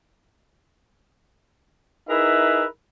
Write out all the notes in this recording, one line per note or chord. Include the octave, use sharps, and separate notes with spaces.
D#4 E4 G#4 A#4 B4 E5